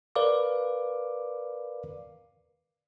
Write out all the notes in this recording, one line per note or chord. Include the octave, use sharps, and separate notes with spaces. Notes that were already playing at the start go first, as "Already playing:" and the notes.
A#4 B4 D5 F5 D6